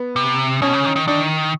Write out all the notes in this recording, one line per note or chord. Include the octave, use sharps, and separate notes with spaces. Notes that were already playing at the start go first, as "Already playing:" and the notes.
Already playing: B3
C3
B2 C#4
C#3
D#3
D#3
D#3 D4